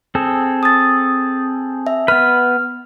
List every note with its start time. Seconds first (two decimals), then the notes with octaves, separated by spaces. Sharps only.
0.15 C4 G#4 A4
0.63 D#6 A6
1.87 E5
2.08 B3 B4 F6